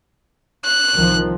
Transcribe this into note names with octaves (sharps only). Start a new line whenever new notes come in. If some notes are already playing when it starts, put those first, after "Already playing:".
F#6
C2 D#3 F3